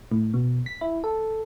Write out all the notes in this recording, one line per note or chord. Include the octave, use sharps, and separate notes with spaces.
A2
B2
B6
E4
A4